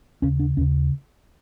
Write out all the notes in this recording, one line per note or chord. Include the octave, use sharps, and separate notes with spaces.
D#2 C#3 C#4
D4
D#2 C#3 C#4